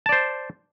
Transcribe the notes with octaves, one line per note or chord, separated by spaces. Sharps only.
C5 D5 A5